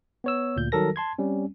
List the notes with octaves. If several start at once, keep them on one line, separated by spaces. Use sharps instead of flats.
B3 C#5 E6
D2 A#2 G6
D#3 F#3 G3 A4 A#4 A#6
A5 C6 G#6
G3 C4 C#4